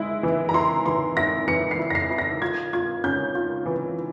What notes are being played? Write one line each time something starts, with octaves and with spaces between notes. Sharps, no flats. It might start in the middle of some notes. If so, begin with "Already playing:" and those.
Already playing: G#3 E4
E3
A#5
E4 C6
E3 C6
E4 A#6
E3 C#7
C7
E4
A#6
C7
E4
A#6
F4 G#6
F4 G#6
C#4 G6
F4
E3